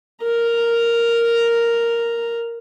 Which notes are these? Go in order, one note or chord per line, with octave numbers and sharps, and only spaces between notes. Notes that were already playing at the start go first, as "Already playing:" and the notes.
A#4 A#5